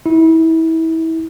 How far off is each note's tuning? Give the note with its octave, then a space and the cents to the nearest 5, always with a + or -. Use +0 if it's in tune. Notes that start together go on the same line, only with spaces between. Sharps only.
E4 -30